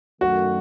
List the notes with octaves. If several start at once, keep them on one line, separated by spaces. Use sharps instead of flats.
F#2 D#3 A3 F#4